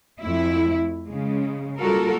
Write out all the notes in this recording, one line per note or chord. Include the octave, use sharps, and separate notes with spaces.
F2 A3 E4
C#3 G#3
G3 A#3 F4 F#4 A4 A#4